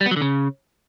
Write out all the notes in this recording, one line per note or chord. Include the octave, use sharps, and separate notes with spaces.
G3
B3
F#3
D3
C#3